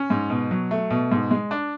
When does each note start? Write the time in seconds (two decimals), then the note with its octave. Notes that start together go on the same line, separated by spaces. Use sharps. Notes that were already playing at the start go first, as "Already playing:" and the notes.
Already playing: C#4
0.10 G#2
0.30 B2
0.51 F#3
0.71 A3
0.90 B2
1.11 G#2
1.31 G#3
1.51 D4